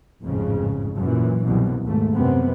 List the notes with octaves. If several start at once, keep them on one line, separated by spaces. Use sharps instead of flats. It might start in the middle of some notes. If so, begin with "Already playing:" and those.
A1 F2 G#2 C#3
F#2 A#2 E3
C2 F#2 B2
D#2 G#2 A3
F#2 C3 B3 C4